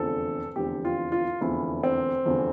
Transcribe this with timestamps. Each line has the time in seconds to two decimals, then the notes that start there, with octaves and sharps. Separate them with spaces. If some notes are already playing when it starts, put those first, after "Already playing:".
Already playing: F1 E2 D3 F3 A4
0.56 F1 E2 D3 F3 G4
0.85 F4
1.12 F4
1.41 F1 E2 D3 F3 E4
1.83 C4
2.26 F1 E2 D3 F3